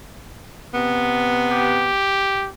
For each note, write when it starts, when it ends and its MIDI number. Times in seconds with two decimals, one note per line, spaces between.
0.73 1.92 48
0.73 1.92 59
1.51 2.49 67